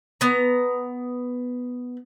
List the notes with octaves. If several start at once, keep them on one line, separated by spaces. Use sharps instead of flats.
B3 A#5